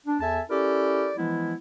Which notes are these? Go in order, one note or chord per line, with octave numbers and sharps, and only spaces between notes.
D4
E2 A4 E5 G#5 A5
C#4 E4 G4 A4 A#4 D5
E3 F3 G#3 B3 E4